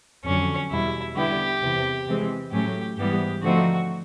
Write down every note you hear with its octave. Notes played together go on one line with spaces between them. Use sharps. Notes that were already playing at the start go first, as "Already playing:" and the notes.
F2 D3 F#3 C#4
E2 B2 G3 E4
D3 G3 B3 E4 G4
E2 C3 E3
C3 E3 G#3 C4
A2 F#3 A3 C#4 G4
G#2 E3 G3 B3 G4
D3 F3 A3 C4 D#4 F#4